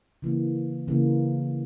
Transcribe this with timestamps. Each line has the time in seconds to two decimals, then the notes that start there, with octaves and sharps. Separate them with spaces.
0.22 C#3 E3 A#3
0.88 C#3 E3 A#3